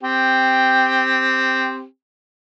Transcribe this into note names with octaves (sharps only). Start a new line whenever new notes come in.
C4 G4